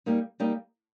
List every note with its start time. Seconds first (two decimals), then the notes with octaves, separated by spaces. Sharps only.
0.06 G3 A#3 D#4
0.40 G3 A#3 D#4